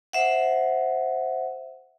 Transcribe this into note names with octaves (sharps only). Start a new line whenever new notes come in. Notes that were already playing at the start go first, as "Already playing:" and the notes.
C5 E5 F#5